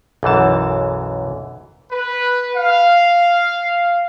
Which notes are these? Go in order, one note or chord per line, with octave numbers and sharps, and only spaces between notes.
B1 F#2 E3 A5
B4
F5